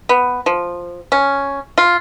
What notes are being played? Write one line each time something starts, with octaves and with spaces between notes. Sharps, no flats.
B3
F3
C#4
F4